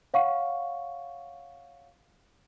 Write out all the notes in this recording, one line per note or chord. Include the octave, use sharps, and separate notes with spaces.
C#5 F5 F#5 C#6